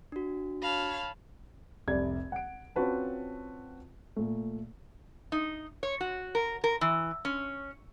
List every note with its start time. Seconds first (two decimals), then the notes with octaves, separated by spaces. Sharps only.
0.12 D4 F#4
0.62 C#5 F5 A5 B5
1.87 F1 C2 D5 G#6
2.32 F#5 D7
2.76 C4 C#4 F4 F#4 B4 A5
4.16 A#2 A3
5.32 D#4
5.83 C#5
6.01 F#4
6.35 A#4
6.64 A#4
6.81 E3
7.25 C#4